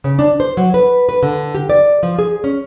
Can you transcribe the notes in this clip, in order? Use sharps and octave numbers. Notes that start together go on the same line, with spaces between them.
C#3
D4
C5
F#3
B4
B4
D3
G4
D5
F3
G#4
C#4